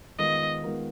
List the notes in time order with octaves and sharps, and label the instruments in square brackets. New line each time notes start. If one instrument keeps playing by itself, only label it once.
[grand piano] D#3 G#3 B3 F4 A#4 [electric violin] D#5
[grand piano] D#3 G#3 B3 F4 A#4